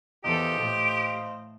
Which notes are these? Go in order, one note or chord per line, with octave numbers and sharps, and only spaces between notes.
E2 G4 A4 C5 D#5 F5
A2 A3